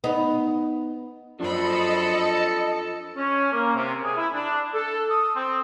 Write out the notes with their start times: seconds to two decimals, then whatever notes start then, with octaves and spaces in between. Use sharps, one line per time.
0.04 B3 D#4
1.40 F#2 F3 C4 D4 A4 D#5 B5 C#7
3.16 C#4
3.52 A#3
3.75 C3
4.03 G#4
4.17 E4
4.34 D4
4.74 A4
5.10 D#6
5.36 C4